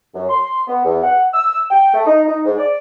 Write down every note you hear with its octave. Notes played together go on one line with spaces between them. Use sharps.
F#2
C6
B3
E2
F#5
E6
G5
A3
D#4
D#4
G#2
D5